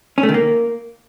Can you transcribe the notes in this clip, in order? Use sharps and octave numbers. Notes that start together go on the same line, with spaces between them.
C#4
A3
D#3
A#3